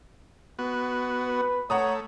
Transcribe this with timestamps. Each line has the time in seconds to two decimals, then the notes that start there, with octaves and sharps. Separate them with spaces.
0.59 B3 F#4
1.24 B4
1.70 A3 C#5 F#5 A#5 D#6